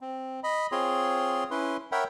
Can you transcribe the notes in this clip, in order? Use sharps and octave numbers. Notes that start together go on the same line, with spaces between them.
C4
D#5 B5
C4 F4 G#4 C#5 C6
C#4 E4 B4 C6
A#4 C#5 E5 F#5 G5 B5